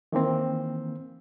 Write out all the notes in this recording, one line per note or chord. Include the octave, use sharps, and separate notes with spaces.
D#3 E3 A#3 C4